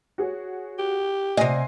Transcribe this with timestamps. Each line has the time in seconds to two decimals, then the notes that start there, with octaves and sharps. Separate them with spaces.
0.18 F#4 G#4 C#5
0.79 G4
1.37 C3 D#5 G#5 C7